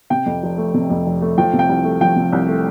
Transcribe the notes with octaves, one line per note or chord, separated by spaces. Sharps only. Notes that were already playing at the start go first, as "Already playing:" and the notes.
C3 G5
F2
F1
A3
C3
F2
F1
A3
F3 G5
C3
G5
C2
A3
F3 G5
C3
C2
A3